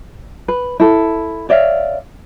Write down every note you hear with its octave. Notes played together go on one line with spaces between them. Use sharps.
B4
E4 A4
C#5 D5 E5 F5